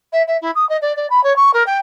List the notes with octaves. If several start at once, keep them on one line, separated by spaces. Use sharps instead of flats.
E5
E5
E4
D#6
D#5
D5
D5
B5
C#5
C#6
A#4
G5